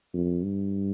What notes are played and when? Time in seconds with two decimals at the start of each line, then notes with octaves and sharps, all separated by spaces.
0.14 F2
0.43 G2